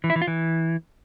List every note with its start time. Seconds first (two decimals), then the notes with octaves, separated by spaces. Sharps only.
0.04 E3
0.10 E4
0.16 E3
0.22 F4
0.27 E3